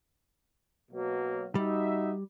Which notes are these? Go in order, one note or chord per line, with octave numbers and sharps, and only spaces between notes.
B2 F#3 A#3
G3 D#4 F#4 E5